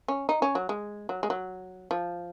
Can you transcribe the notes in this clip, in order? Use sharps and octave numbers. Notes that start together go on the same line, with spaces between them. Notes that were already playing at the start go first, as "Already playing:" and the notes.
C#4
D#4
C#4
F#3
G#3
F#3
G#3
F#3
F3